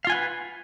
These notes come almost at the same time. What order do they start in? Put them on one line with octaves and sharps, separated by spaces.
F5 F4 G#5 F#5 B4